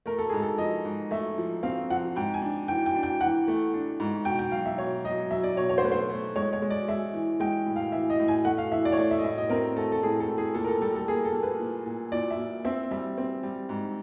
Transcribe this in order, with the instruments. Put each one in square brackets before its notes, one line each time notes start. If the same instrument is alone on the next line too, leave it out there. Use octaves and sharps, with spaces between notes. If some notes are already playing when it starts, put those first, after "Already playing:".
[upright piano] A3 A#4
A4
G#2 G#4
A4
F3 D#5
G#2
A3 E5
F3
C4 F5
F3 F#5
G#2 G5
G#5
D4
E3 G5
G5
D4
G5
E3 F#5
A3
D4
G#2
B2 G5
G5
F#3 F5
E5
B2 C#5
F#3 D#5
F#3 E5
D5
B2 C#5
C#5
C5
A3 B4
C5
A3
G#3 C#5
C#5
G#3
D5
G#3 E5
E3
G#3 G5
A2
F5
E3 E5
D#5
A2
G#5
A3 F#5
F5
E3 E5
D5
C#5
A3 D5
E5
D#5
A2 E5
D#5
C4 A#4
A3 A4
A4
A2 G#4
A4
A2
G#4
A#2 A4
A#4
A4
G3 A4
A4
A#3 G#4
A4
A#3
B4
A#2
A#2
A#2 D5
E5
A#2
C4 E5
G3 E5
C4
G3
G#2